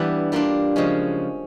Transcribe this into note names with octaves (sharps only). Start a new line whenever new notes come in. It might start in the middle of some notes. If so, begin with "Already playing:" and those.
Already playing: E3 G3 B3 D4
G3 A#3 D4 F4 A#4
C#3 F3 G#3 C#4